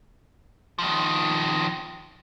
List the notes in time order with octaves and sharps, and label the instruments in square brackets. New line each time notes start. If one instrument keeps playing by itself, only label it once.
[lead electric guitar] D#3 F3